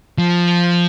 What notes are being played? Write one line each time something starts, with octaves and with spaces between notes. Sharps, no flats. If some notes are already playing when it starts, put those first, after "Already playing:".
F3